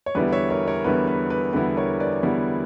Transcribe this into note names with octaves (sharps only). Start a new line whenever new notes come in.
C#5
E2 D3 G3 B3 E4 B4 D5
C#5 E5
A#4 C#5
A#4 C#5
E2 D3 G3 B3 E4 B4
B4
B4
E2 D3 G3 B3 E4 B4
A#4 C#5
B4 D5
E2 D3 G3 B3 E4